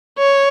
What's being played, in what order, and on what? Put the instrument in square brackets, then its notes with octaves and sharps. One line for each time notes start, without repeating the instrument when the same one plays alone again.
[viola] C#5